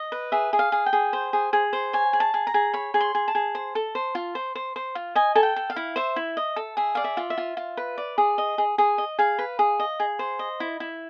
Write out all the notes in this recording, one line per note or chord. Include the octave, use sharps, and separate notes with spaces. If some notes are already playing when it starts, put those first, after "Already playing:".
Already playing: D#5
B4
G#4 E5
G#4
F5
G#4
G5
G#4
C5
G#4
G#4
C5
C#5 G#5
G#4
A5
G#4
A#5
G#4
C#5 B5
G#4
C6
G#4
A5
G#4
C5
A4
C5
F4
C5
C5
C5
F4
D#5 G#5
A4 G#5
G5
A4
F5
E4
C5 E5
E4
D#5
A4
G#4 E5
D5 F5
E5
F4
E5
F4
F4
B4
D5
G#4
D#5
G#4
G#4
D#5
G#4 F5
B4
G#4
D#5
G#4
C5
D#5
E4
E4